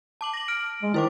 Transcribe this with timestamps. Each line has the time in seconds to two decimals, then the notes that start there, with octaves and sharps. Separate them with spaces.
0.21 A5 D6 F#7
0.33 A#6 F#7
0.48 F6 D7
0.82 G#3
0.94 D#3 E4 C5 D6